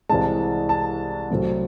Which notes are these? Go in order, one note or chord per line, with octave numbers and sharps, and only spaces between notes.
C2 C3 E3 G#3 A5
A5
C2 C3 F#3 A3